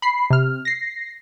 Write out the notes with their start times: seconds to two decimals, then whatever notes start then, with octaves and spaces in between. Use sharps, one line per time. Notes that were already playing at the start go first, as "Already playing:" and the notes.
0.02 B5 C7
0.30 C3 F6
0.65 A#6 C7